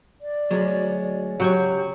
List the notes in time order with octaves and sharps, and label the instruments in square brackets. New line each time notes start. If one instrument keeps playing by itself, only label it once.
[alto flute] D5
[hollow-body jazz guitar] D2 F#3 [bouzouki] G#3 C#4
[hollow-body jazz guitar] C#3 C#5 [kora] F#3 G5 [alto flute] G4